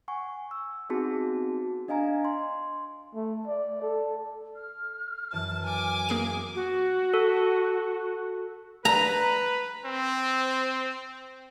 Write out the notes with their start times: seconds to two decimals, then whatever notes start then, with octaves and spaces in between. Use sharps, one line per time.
0.08 F#5 G#5 C#6
0.51 E6
0.89 B3 C4 D#4 F#4 G#4 A5
1.88 D4 D#5 F5 G#5 A#5 G#6
2.25 C6
3.15 A3
3.47 D5
3.82 A4
4.56 F6
5.33 F#2 E3 A5
5.65 G#5 D6
6.09 A#3 G#4 D#7
6.55 F#4
7.14 A4
8.85 B4 A#5
9.86 C4